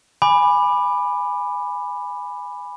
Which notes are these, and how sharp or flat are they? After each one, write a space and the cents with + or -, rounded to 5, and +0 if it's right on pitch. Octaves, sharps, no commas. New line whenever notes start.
G#5 -10 B5 +0 D6 +20